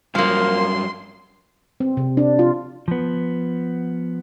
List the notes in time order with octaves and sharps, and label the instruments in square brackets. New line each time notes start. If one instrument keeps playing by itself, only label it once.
[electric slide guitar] G2 F#3 [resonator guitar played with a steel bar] F3 A#3 [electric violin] C6
[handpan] C4
C3
D4
F4
[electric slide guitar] F3 B3